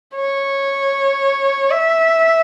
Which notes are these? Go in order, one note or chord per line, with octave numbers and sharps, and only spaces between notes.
C#5
E5